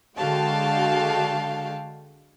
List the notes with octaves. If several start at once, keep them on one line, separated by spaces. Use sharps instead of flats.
D3 G#3 F#4 F5 G5 A5